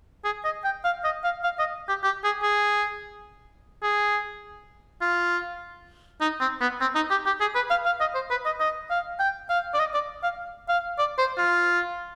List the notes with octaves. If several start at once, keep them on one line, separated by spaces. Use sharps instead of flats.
G#4
D#5
G5
F5
D#5
F5
F5
D#5
G4
G4
G#4
G#4
G#4
F4
D#4
C4
B3
C4
D#4
G4
G4
G#4
B4
F5
F5
D#5
C5
B4
D#5
D#5
F5
G5
F5
D5
D#5
D5
F5
F5
D5
C5
F4